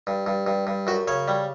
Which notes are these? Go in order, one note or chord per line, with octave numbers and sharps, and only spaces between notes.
G2
G2
G2
G2
F#2 F#4
C#3 C#5
G3